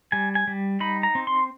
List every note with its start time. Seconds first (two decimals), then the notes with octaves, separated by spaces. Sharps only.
0.12 G3 G#5
0.35 G#5
0.47 G3
0.80 D#4 B5
1.03 A#5
1.15 C4
1.27 C6